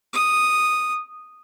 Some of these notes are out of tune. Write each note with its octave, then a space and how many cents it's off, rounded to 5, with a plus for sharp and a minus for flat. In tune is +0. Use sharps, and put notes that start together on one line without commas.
D#6 -5